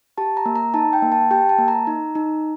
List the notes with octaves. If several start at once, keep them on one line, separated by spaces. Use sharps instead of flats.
G4 A5
A#5
A#3
A#5
D#4 A5
G5
A#3
A5
G4 G5
A5
A#3
A#5
D#4
D#4